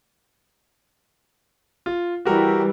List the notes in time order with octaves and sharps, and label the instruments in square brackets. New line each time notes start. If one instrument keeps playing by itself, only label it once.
[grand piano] F4
[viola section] E3 G3 [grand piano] F#4 G4 A#4